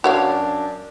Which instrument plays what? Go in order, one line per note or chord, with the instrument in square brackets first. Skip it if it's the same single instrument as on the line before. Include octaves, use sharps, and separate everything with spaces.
[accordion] F#2 D4 [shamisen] F#4 C#5 F5